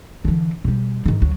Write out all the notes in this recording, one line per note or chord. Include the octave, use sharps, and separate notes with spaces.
D3 E3
B2 G3
G#2 D#3
D2 F#3